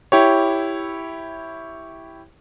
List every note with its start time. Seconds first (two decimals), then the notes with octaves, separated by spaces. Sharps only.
0.12 E4 G4 C#5